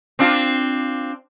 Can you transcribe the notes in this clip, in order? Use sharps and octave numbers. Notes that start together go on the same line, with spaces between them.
C4 D4 F4